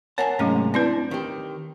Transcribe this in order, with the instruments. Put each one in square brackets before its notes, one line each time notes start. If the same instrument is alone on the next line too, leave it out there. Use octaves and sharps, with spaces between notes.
[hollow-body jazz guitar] A#4 F#5 A5 [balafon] C#5 G#5
[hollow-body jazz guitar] G#2 C3 A#3 [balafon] F#3 A3 C#4
[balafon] C4 E4 B4 [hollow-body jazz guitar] D4
[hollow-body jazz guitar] D#3 G4